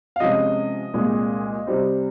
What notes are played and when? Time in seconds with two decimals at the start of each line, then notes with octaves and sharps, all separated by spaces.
0.16 F5
0.20 C3 F3 G#3 C#4 D#5
0.93 C2 A#2 G#3
1.67 C3 G3 C4